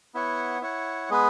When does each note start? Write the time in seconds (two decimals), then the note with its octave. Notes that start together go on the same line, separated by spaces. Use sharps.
0.15 B3 E4 C#5 F#5
0.61 E4 C#5 F#5
1.09 G#3 B3 G#4 B4